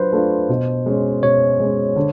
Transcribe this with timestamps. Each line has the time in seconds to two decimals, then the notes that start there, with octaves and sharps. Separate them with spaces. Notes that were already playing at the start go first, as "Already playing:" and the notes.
Already playing: F#3 D4 F4 B4 C5
0.13 A3 D4 F4
0.49 B2
0.86 G#3 C#4
1.23 B2 C#5
1.60 G#3 C#4
1.96 D3